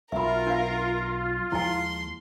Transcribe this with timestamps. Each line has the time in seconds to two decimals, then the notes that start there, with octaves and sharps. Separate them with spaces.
0.12 B1 F4 A#4 E5 B5
0.47 D4 F5
1.52 D#2 F3 G#3 E4 G#5 C6